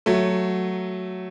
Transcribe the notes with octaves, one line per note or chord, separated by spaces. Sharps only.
F#3 A3